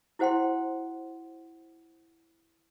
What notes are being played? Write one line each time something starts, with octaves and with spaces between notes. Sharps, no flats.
E4 F#4 C5 F#5 G5 C6